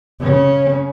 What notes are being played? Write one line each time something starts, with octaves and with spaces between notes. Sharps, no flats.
C#3 C#4